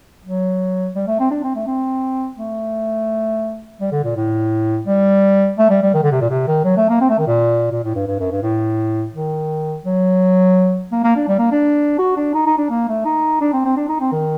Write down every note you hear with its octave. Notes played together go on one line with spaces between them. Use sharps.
F#3
G3
A3
C4
D4
C4
A3
C4
A3
G3
D3
A#2
A2
G3
A3
G3
G3
D#3
D3
C3
A#2
C3
D#3
F#3
A3
A#3
C4
A3
D#3
A#2
A#2
A2
G2
G2
F#2
G2
A2
D#3
F#3
A#3
A#3
D4
G3
A#3
D4
F#4
D4
D#4
D#4
D4
A#3
A3
D#4
D4
C4
C4
D4
D#4
C4
D#3